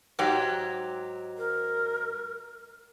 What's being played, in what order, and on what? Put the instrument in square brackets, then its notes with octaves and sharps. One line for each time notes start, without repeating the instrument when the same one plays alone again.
[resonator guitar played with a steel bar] G#2 F#3 G4
[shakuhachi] A#4